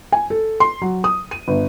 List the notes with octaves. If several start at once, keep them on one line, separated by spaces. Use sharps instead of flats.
G#5
A4
C6
F#3
D#6
D#7
G1